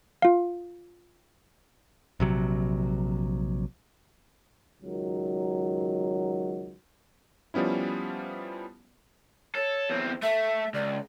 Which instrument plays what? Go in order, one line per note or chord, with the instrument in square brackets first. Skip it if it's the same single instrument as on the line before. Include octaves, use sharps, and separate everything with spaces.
[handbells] F4 F5
[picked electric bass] A#1 C3 F#3
[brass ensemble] C#2 D#3 F#3
[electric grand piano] F3 G3 B3 C#4 E4
[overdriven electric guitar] A4 [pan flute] C#5
[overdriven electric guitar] E2 C4
[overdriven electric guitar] A3 [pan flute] E5
[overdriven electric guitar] C#2 [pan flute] D5